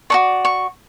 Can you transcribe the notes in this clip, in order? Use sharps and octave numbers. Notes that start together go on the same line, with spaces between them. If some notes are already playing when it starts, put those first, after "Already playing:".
F#4 A4 D5 C#6
C#6